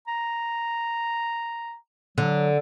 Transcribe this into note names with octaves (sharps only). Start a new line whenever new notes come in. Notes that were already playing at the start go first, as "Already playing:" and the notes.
A#5
D3 F#3